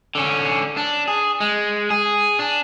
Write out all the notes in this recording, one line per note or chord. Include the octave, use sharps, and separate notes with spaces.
D3 C#4
D4
G#4
G#3
G#4
D4